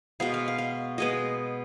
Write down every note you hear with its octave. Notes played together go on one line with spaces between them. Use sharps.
B2 G#3 B3 F5
F5
F5
F5
B2 G#3 B3 D#5